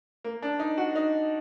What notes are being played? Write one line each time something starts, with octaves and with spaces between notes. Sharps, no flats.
A#3
D4
D#4
F#4
D#4